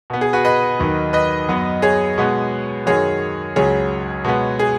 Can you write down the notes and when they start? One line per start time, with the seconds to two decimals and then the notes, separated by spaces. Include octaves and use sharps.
0.10 B2 B3
0.21 G#4
0.33 F#4 B4
0.45 B4 D#5
0.79 D#2 D#3 F#3
1.13 B4 D#5
1.49 F#2 F#3 B3
1.82 G#4 C#5
2.18 B2 G#3 B3
2.86 F#2 D#3 F#3 G#4 C#5
3.56 C#2 C#3 F#3 G#4 C#5
4.25 B2 G#3 B3
4.59 G#4